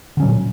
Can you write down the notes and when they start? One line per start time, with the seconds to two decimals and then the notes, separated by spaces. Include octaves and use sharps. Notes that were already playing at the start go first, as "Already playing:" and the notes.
0.17 D3
0.20 C#4
0.22 F#3
0.25 A#2